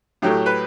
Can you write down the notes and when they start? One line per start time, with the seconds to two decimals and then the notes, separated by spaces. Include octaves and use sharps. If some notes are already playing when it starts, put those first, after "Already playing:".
0.22 A2 F#3 A3 G4
0.46 B4